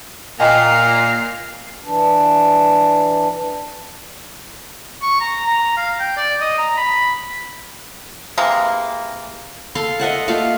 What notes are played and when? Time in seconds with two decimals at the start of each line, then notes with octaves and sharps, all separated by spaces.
0.40 A#2 D#5 F5 G5 G#5 A#5 C7
1.85 E3 D4
5.02 C#6
5.20 A#5
5.47 A#5
5.78 F5
6.00 G5
6.17 D5
6.41 D#5
6.58 A#5
6.77 B5
8.38 C3 E3 G#3 A#3
9.75 A4 F5 C6
10.00 D#5 E5 F#5 A5
10.28 A3 A#3 F4 F5